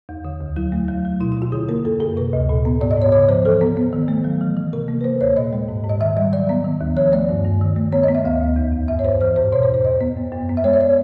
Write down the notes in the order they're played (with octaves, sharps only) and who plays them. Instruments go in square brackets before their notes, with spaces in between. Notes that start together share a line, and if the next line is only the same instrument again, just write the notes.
[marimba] E2
D3
D2
F#3 E4
A3
F#3
F#3
B2 E4
E4
B2 F4
D3 G#4
A#3 A#4
F#2 A4
F#2 G#4
C3 B4
D2
A#2
B3
G#2 D5
D#5
G#2 C#5
C#3 C#5
F3 C5
E3 A4
B3
B3
D#3
A3
F#3
E3
E3
C3 A#4
A#3
B4
A#3 C5
D#2 C#5
A#2 D#5
G#3
G#2
G#2
D#5
D#3 E5
G3 D#5
F#3 D5
B3
D#3
D#2
F3 C#5
A3 D5
G2
G2
D#3
A3
B3 C#5
D#5
B3
E5
D2 F5
D2
E2
E2
G2 E5
C#5
G2 C5
E3 C5
G#2 C5
B2 C#5
C5
E2
C5
F#2 D#5
B3
F#2
F#2
B3
E5
G#3 C#5
D5
C#5